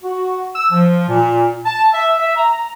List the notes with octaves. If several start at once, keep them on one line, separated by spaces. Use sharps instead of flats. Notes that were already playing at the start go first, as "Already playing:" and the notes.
F#4
E6
F3
A#2
A5
E5
E5
A#5